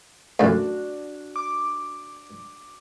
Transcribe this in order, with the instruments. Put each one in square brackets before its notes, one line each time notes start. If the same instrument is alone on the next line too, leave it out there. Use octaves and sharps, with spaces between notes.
[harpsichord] F#2 A2 [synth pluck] D4 F#4
[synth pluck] D6